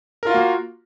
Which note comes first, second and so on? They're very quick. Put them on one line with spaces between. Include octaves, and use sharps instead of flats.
A#4 F4 F#4 A#3